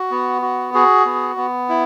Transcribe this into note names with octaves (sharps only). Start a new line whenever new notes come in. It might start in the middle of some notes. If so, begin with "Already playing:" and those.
Already playing: F#4
B3
F#4
F#4 G#4
B3
B3
E4